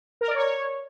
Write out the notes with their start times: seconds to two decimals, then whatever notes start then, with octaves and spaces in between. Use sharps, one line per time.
0.21 A#4
0.28 D5
0.35 C#5